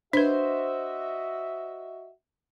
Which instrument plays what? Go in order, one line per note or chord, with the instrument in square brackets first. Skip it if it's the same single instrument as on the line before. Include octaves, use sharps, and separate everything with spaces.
[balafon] D4 B4 [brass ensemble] F#4 D#5 E5 [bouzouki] C5